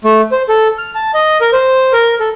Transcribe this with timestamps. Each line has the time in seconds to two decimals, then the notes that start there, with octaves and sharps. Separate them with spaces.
0.04 A3
0.32 C5
0.49 A4
0.78 F6
0.95 A5
1.14 D#5
1.41 A#4
1.53 C5
1.93 A#4
2.20 A4